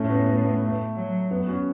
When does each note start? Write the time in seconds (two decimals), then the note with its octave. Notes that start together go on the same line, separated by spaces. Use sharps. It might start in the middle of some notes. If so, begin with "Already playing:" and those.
Already playing: A2 A3 C#4
0.10 B3
0.27 B3
0.44 B3
0.62 A3
0.95 F#3
1.31 B3
1.47 C#4 F#4